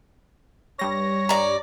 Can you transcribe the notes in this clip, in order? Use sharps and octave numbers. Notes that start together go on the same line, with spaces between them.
G2 G3 C#5 A#6
D5 A#5